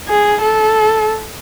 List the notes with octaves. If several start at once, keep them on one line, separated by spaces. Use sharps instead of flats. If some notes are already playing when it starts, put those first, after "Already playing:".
G#4
A4